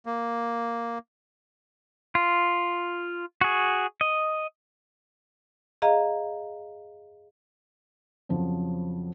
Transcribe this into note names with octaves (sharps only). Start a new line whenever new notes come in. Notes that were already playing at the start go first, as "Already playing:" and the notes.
A#3
F4
F#4 G#4
D#5
G#4 D#5 F5 A#5
F2 C#3 F3 F#3